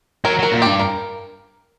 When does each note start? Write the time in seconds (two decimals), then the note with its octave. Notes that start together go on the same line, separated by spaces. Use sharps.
0.25 F#3 A#4
0.39 F#3 A#4
0.52 A#2
0.62 G2 G4
0.79 A#4